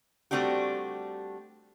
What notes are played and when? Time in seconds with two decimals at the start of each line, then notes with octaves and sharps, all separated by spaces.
0.31 G3 A3 C4 D4 F#4 G4